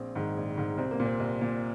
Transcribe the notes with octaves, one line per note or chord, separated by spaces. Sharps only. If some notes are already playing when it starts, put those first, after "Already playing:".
Already playing: A#1 C4
G#2 D#3
A#1
G#2 D#3
C2 C4
A#3
A#2
C4
C2
A#2